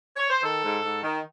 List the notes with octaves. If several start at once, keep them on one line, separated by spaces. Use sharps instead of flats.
C#5
C5
D#3 A4
G#2
G#2
D#3